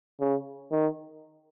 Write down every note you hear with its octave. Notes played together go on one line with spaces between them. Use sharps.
C#3
D#3